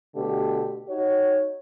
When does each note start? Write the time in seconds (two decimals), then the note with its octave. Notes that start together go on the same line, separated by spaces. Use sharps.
0.15 B2 D3 A3 G4
0.89 D#4 F#4 C#5